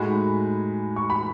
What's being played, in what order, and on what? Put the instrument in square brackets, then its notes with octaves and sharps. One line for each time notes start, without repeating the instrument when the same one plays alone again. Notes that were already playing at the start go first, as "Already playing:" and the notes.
Already playing: [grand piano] A2 G#3 D#4 F#4 [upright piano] G#5 B5
[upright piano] C#6
B5